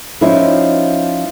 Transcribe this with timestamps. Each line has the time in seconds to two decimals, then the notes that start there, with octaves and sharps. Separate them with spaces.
0.21 F3 C#4 D#4 E4